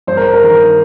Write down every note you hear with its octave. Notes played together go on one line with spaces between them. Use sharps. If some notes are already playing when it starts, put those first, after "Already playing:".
G2 C5
A#4
A#4
D#3